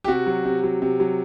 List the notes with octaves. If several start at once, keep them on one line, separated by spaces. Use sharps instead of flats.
G4
C3 F#4
F#3
C3
F#3
C3
F#3